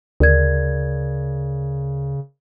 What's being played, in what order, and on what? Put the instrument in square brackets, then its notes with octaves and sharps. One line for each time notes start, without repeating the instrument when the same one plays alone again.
[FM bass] D2 [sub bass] C#3 [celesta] A#4 D5 G#6